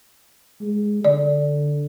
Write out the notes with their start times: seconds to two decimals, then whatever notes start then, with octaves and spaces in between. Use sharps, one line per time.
0.61 G#3
1.05 D3 D5